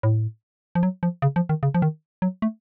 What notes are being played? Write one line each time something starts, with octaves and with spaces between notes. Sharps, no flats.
A2
F3
F#3
F3
C#3
F3
D#3
C#3
F3
D#3
F#3
A3